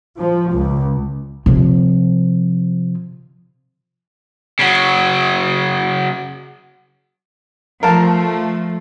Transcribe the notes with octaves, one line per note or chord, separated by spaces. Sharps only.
F3
C#2
C3 F3
C#3 F#3
F3 A3 A#4 F5 A5